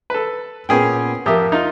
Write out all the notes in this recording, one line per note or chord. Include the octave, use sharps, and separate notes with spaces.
A4 B4
A#2 B3 C#4 G#4 G5
F2 G4 A#4 E5 D#6
D#4 F4